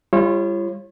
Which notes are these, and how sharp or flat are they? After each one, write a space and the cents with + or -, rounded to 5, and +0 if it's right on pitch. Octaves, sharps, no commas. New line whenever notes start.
G3 +30 F4 -35 C#5 -35